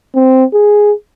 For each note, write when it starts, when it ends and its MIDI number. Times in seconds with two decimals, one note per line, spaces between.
0.15 0.44 60
0.53 0.92 68